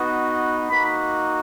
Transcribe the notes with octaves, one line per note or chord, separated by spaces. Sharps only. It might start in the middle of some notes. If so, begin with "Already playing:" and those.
Already playing: B3 D#4 F#4
A#3 D#4 F#4 B5